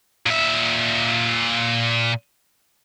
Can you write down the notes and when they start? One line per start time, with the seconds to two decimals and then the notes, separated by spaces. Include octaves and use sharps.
0.26 A#2 E5